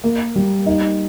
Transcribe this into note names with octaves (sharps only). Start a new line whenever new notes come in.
A#3
G3
D#4